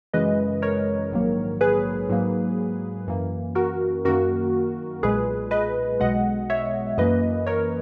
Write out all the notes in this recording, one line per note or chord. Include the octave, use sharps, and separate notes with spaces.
F#2 C#3 E3 G#3 B4 D#5
A#4 C#5
A#1 G#2 D#3 F#3 A#3
G#4 B4
G#2 F#3 A#3
F#2 E3 A#3
F#4 A#4
F#2 D#3 A#3 F#4 A#4
B1 A#2 G#3 G#4 B4
B4 D#5
B1 B2 G#3 D#5 F#5
C#5 E5
F#2 E3 A#3 B4 D#5
A#4 C#5